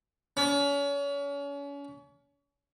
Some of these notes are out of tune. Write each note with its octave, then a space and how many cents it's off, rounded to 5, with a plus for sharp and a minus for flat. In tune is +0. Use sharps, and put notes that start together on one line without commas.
C#4 +35